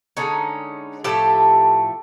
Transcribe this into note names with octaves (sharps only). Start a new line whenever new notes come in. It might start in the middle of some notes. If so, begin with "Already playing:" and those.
D3 F3 G#3 C#4 D#4
A2 F3 A3 G4 A4